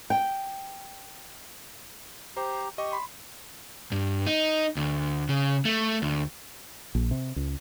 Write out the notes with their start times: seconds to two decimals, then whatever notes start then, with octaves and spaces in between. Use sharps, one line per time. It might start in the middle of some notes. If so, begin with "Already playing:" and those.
0.10 G5
2.37 G4 C5 A#5
2.78 G4 D#5 C#6
2.92 B5 C6
3.92 G2
4.26 D#4
4.77 D2
5.29 C#3
5.65 A3
6.02 D2
6.95 A#1
7.11 C3
7.36 C#2